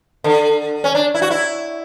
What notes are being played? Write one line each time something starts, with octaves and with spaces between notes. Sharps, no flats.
D3
C#4
D4
E4
F#4
E4